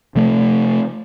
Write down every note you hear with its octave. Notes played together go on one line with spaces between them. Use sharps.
C3 F3 A3